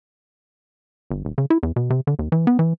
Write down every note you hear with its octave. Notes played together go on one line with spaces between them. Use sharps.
G1
D#1
C#3
E4
E2
B2
C3
D3
D#2
E3
B3
E3